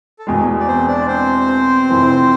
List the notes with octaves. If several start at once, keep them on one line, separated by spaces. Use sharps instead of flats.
A4
E2 B2 G#3 G#4
D5
C4 C5
D4 D5
C4 C5
F1 F2 E3